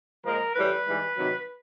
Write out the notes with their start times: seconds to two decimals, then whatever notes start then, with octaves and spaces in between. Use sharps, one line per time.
0.24 A#2 F3 G#3 A#4
0.55 A2 E3 G3 B4
0.86 G#2 E3 G3
1.16 C3 D#3 F#3